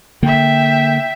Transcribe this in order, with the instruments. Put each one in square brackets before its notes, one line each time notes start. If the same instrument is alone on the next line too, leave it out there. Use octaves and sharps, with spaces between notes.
[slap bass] D3 A#3 [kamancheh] E5 G5